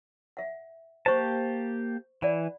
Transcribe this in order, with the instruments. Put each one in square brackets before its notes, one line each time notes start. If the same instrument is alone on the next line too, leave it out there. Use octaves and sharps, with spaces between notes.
[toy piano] E5 F#5
[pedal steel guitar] A#3 G4 A5 [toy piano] C5 C#6
[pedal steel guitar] E3 [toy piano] D5 F#5 B5